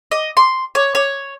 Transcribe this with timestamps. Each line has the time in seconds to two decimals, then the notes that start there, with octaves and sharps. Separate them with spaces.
0.11 D#5
0.37 C6
0.75 C#5
0.95 C#5